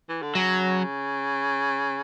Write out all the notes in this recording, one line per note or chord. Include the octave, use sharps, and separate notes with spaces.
E3
D3
C#3 F#3